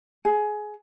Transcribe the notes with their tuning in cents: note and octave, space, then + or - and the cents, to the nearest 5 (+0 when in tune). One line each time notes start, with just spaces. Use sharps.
G#4 +20